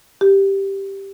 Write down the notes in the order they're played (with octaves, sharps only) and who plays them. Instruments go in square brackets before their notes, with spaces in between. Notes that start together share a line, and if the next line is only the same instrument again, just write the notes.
[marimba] G4